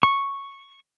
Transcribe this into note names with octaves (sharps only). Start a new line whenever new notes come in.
C#6